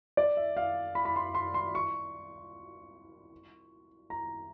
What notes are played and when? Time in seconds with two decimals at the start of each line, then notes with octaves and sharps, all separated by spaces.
0.17 D5
0.37 E5
0.57 F5
0.95 B5
1.05 B5
1.16 C6
1.35 C6
1.54 C6
1.75 C#6
4.10 A#5